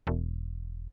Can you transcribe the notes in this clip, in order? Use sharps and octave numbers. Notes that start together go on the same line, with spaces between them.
E1